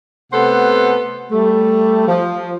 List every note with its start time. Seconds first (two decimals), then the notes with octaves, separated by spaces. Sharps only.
0.33 C3 A3 B3 A4 C5 F#5
1.31 G3 A3
2.08 F3